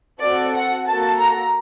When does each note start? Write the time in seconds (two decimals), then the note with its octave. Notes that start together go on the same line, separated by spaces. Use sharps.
0.21 C4 F#4 A4 D5
0.54 F#5
0.87 A#3 F#4 A4 A5
1.19 A#5